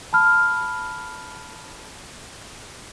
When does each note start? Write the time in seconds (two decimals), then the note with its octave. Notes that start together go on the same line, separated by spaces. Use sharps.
0.13 A5 B5 F6